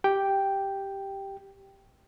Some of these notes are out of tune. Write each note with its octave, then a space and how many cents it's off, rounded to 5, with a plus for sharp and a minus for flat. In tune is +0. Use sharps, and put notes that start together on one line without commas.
G4 +0 G5 +0